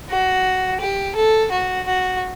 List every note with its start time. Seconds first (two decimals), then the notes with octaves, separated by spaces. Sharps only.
0.10 F#4
0.80 G4
1.15 A4
1.52 F#4
1.87 F#4